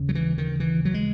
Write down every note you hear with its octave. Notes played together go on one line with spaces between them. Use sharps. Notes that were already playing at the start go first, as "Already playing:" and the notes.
Already playing: D#2 C#3
F#3
E3
D#3
E3
F#3
G#3